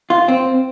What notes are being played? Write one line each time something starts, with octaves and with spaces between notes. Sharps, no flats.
F4
C4